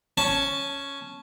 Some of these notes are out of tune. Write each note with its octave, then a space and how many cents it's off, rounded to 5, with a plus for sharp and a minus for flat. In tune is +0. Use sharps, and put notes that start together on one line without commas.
C#4 +0 A5 -15